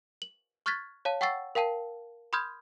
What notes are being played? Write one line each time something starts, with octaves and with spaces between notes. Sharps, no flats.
F#7
C#6 F6 F#6 G#6 A6 B6
C#5 F5 A5
F#5 G5 C#6 E6 A6 C7
A#4 F5 G5 A5 C7
B5 C6 D#6 F6 G6 G#6